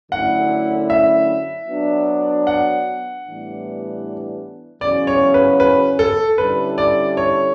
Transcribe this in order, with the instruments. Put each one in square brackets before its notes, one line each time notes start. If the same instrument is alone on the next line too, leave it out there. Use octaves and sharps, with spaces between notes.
[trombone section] F#2 D3 A3 C#4 E4 [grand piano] F#5
[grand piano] E5
[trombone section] F#3 B3 D4
[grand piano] F#5
[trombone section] A2 E3 G3 B3 D4
[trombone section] E2 C#3 F#3 C#4 [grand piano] D5
[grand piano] C#5
B4
B4
A4
[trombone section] D3 G3 C#4 E4 A4 [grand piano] B4
[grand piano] D5
C#5